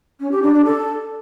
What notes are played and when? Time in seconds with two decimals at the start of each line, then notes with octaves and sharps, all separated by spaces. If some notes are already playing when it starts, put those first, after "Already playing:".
0.20 C#4
0.32 G4
0.43 D4
0.54 D4
0.65 A4